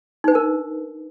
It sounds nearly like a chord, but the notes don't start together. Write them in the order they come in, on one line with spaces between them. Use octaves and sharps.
D#4 B4 D4 A#4